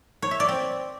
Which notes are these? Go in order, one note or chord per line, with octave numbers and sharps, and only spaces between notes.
C#5
E5
D5
C4